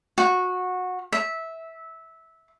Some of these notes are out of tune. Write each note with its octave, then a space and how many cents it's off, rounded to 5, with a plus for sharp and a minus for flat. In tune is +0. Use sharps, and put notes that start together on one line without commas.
F#4 -20
E5 -15